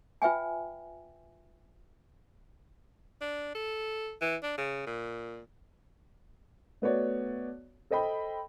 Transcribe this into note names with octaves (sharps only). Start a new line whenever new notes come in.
F4 B4 E5 G5 G#5
D4
A4
E3
D4
C#3
A#2
A3 B3 F#4 C#5 D5
A4 C5 D#5 G5 B5